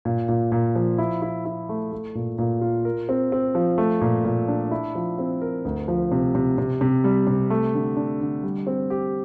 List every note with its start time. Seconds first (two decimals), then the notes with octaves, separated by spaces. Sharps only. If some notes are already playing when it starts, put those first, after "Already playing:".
0.05 A#2
0.29 A#2
0.52 A#2
0.75 F3
0.98 E4
1.22 E4
1.45 E4
1.69 A3
1.92 A3
2.15 A#2
2.39 A#2
2.61 F4
2.85 A#4
3.09 C4
3.32 C4
3.55 F3
3.78 A3
4.01 A#2
4.25 A#2
4.48 D4
4.71 E4
4.95 F3
5.19 C4
5.42 A#4
5.65 D2
5.88 F3
6.12 C3
6.35 C3
6.58 C3
6.81 C3
7.04 G3
7.27 C3
7.50 A3
7.75 D3
7.97 D4
8.21 D3
8.43 G3
8.67 C4
8.90 G4